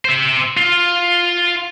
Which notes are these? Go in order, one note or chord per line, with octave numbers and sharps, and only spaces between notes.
C5 E5
F4